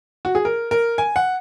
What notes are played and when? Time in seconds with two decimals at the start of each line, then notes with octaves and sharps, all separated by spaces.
0.25 F#4
0.35 G#4
0.45 A#4
0.71 A#4
0.98 G#5
1.16 F#5